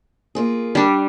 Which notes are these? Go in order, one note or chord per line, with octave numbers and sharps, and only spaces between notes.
A#3 F4 G#4
G3 D4